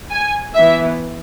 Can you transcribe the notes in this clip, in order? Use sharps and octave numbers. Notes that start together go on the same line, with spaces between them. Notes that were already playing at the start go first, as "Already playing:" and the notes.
G#5
E3 B3 E5